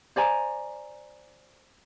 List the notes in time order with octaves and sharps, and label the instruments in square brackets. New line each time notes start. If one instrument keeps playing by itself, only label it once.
[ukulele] C5 D5 G#5 A#5